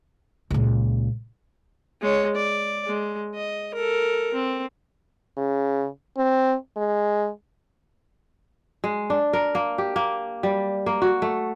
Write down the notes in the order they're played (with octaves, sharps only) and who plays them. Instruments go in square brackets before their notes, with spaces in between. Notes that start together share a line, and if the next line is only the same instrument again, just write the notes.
[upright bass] C#2 A#2
[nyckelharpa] G#3 C#5
D5
G#3
D#5
A4 A#4
C4
[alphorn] C#3
C4
G#3
[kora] G#3
D4
A#4
A#3
G4
A#3
G3
A#3
F#4
A3